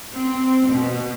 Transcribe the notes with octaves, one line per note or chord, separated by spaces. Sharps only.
C4
B2